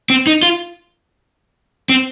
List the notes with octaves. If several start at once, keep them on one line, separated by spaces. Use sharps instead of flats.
C4
D#4
F4
C4